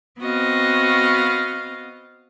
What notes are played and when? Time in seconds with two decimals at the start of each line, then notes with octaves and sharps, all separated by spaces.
0.19 B3 C4 F#4 D#5 F5